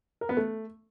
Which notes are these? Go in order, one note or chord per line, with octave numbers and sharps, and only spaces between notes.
A#4
B3
A3